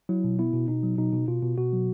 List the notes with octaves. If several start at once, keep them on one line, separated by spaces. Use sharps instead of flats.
F#3 E4
B2
B3 E4
B2
B2 D#4
F#3
B2 D#4
B2
B2 F4
B2
B2 F#4
F#3